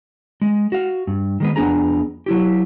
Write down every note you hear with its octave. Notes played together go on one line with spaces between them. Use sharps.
G#3
F#4 F5
G2
D#3 G#3 B3
F2 B3 D4 G#4 A#5
F#3 E4 G4